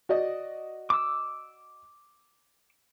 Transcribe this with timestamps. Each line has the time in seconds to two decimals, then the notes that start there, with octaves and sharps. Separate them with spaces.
0.09 F#4 D5 D#5
0.90 D6 E6